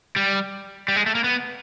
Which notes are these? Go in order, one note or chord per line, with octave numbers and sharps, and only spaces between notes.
G3
G3
G#3
A3
A#3
B3